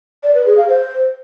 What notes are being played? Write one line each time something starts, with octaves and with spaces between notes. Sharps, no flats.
D5
B4
G#4
F5
C5